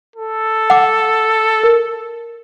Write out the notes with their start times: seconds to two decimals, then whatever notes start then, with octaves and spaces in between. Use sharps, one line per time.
0.16 A4
0.70 F#5 D6
1.64 A#4